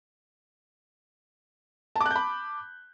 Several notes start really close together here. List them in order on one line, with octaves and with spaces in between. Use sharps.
A5 D6 F#6 G6 B5